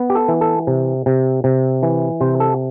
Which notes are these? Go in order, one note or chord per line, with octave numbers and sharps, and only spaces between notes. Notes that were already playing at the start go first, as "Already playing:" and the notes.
Already playing: B3
G4
A4
E3
A4
C3
C3
C3
E3
C3 C5
A4